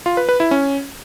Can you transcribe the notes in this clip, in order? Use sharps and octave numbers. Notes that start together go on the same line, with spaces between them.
F4
B4
B4
E4
C#4